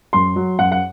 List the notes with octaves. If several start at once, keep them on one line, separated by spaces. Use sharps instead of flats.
F#2 C6
F#3
F#2 F#5
F#5